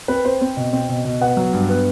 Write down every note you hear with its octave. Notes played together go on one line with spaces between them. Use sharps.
C4 B4
C4 C5
C4
B2
C4
B2
B2
B3 F#5
F#3
G2
B3